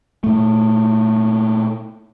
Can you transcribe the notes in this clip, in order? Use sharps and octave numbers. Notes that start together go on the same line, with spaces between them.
A#2 A3